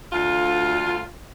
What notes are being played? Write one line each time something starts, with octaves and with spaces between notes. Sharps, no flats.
D2 F4